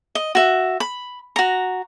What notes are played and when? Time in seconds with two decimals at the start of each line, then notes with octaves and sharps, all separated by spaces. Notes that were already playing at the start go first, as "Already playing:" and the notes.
0.15 D#5
0.35 F#4 E5
0.80 B5
1.36 F#4 A#5